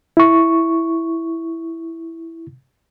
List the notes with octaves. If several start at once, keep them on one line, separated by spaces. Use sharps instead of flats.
E4 C#6